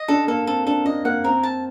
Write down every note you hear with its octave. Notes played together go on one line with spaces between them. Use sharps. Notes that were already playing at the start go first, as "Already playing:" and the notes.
Already playing: D#5
D4 A4
A#3 A4
C4 A4
D4 A4
D4 D#5
A#3 F#5
C4 A#4
A5